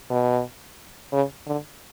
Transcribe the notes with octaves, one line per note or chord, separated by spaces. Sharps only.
B2
C#3
D3